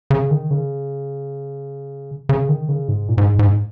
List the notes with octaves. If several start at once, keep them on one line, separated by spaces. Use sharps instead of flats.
C#3
D#3
C#3
C#3
D#3
C#3
G#2
A#2
G#2
G#2